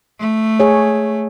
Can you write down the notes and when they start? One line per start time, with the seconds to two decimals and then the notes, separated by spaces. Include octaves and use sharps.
0.20 A3
0.60 G#4 C#5